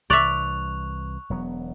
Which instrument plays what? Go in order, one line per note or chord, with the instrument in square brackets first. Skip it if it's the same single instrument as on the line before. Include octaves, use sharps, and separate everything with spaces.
[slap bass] C2 E3 [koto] D5 E5 [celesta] C#6 F#6 F7
[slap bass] E1 F#3 B3